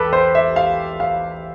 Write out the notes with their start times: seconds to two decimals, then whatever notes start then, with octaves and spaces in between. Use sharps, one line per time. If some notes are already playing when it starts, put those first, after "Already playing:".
Already playing: E2 G4 A4 B4
0.13 C5
0.35 E5
0.56 F5
1.00 F5